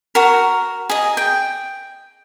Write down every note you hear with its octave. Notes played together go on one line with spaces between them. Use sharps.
F#4 A#4
G#4 D#5
G5